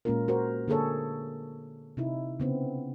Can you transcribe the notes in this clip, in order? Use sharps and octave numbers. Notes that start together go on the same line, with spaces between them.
A#2 G#3 A#3 C#4 F4 A#4
F#4 A#4 C5
D3 A#3 G#4 A4 C#5
C3 D#4 E4
C#3 B3 C4